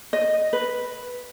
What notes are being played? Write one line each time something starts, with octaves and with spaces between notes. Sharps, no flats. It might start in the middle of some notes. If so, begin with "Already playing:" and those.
D#5
B4